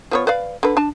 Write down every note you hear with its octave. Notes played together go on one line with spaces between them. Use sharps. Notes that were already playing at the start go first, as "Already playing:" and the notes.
F3 B3 C#5
B4 D5 F5
D3 B4
D4 A5